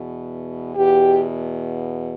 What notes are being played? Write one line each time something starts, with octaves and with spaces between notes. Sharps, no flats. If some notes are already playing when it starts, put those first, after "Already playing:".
Already playing: E2 B2
E2 B2 G4